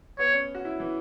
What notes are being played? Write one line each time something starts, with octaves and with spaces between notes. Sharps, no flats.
B3 C#5
C#4
F#4
E4
E3